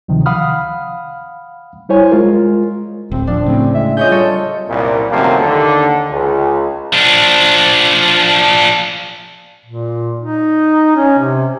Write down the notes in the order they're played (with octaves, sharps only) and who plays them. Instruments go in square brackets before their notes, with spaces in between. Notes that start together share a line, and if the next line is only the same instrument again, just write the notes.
[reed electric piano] D2 C3 D#3 F3
F5 F#5 B5 D#6 F6
G3 E4 C5 C#5 G#5
G#3 F4 A#4
[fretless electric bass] D1 [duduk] C4
[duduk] F3 [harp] D4
[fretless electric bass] A2 C#3 [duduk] C4
[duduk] G#3 [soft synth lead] E5
[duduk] F4 [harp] G#4 C#5 D#5 [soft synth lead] G6
[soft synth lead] G3 [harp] A4 C#5
[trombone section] C2 F#2 A#2
F#2 C3 D#3 F3 A3 A#3
D#2 D3
C#2
[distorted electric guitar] F3 D4
[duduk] A#2
D#4
C#4
C3